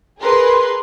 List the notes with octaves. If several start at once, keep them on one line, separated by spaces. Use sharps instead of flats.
G#4 A#4 B4 C6